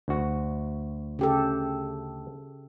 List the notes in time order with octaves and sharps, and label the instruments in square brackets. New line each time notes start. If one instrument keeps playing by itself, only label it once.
[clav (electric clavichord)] D2 F#4
[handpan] C#3 G4 A4